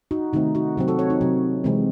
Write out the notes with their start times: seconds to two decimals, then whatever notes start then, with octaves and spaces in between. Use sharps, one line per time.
0.11 D#4 F#4
0.33 C3 D#3 A3 C4 D#4
0.55 D#4 F#4
0.77 C3 F#3 C4
0.88 F#4 A4
0.99 A4 C#5
1.10 D#4
1.21 C3 F#3 C4
1.64 C3 E3 G#3 C4